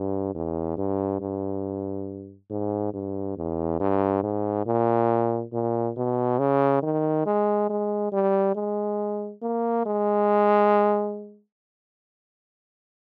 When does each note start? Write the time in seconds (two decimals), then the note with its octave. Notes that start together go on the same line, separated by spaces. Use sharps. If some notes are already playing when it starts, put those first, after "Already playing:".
Already playing: G2
0.35 E2
0.77 G2
1.21 G2
2.51 G#2
2.94 G2
3.37 E2
3.80 G2
4.23 G#2
4.66 A#2
5.53 A#2
5.97 B2
6.39 C#3
6.83 D#3
7.26 G#3
7.70 G#3
8.12 G3
8.56 G#3
9.42 A#3
9.86 G#3